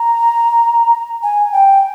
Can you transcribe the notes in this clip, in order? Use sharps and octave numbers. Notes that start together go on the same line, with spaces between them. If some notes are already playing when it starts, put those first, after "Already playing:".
Already playing: A#5
G#5
G5